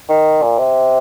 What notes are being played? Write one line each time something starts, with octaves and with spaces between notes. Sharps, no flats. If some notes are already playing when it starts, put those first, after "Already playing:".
D#3
A#2
C3